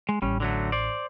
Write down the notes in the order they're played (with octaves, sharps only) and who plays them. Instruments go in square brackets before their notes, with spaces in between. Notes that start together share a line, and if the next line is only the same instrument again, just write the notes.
[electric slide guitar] G#3
[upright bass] A1 [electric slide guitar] G3 C#4
[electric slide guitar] D3 F#3 A3
C5 D5